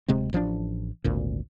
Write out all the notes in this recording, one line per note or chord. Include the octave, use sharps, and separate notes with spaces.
D1 C3 G#3 C4
A1 F3 F#3 D4
G#1 D2 A#2